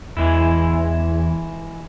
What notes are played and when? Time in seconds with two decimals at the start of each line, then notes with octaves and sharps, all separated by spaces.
0.17 E2 E3 G#3 E4